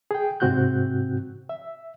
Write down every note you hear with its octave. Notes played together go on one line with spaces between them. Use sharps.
G#4 G5
G#2 C3 C4 F#4 F#6 G6
E5